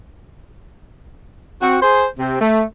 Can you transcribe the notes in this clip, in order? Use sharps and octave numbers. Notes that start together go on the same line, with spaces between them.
C4 F#4
G#4 C5
C3 C4
A3